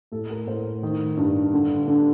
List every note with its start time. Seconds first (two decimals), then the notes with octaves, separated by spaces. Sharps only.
0.12 A2 A4
0.30 A#4
0.47 A2 C5
0.83 D#3
1.17 G2
1.53 D3
1.88 D3